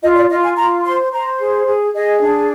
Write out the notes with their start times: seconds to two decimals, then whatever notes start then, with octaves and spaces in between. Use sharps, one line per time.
0.03 F4 D#5
0.16 D5
0.30 F4 D#5
0.44 G#5
0.57 F4 A#5
0.85 C5 C6
1.12 C5 A#5
1.39 G#4
1.66 G#4
1.94 G#4 D#5
2.21 D4